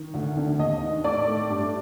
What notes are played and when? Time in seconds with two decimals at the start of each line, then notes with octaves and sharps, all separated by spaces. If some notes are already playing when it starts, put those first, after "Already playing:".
Already playing: D#3
0.14 D2
0.37 D3
0.59 D#2 D#5
0.82 D#3
1.04 A2 D5
1.28 A3
1.49 G2